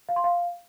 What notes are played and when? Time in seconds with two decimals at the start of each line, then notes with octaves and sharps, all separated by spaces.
0.09 F5
0.16 C6
0.24 F5